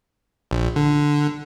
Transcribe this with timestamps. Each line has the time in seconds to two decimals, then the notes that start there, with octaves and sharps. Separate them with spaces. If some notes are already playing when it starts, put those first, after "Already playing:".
0.51 A#1
0.76 D3